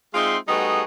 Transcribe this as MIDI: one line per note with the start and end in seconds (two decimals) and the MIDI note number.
0.14 0.37 56
0.14 0.37 60
0.14 0.37 63
0.14 0.37 65
0.14 0.37 76
0.14 0.37 84
0.48 0.83 55
0.48 0.83 57
0.48 0.83 59
0.48 0.83 63
0.48 0.83 66
0.48 0.83 68